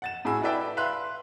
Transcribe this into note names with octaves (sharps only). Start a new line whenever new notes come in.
F#5 A6 E7
A2 F#4 G#4 G#5 B5 E6
E4 A4 B4 D5 E5 G5
B4 E5 F5 C6 F#6